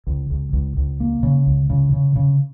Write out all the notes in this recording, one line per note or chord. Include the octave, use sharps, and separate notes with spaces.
C#2
C#2
C#2
C#2
A#3
C#3
C#2
C#3
C#3
C#3